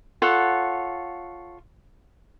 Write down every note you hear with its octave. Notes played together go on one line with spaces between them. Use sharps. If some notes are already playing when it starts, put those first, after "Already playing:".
F4 A4 C#5 F#5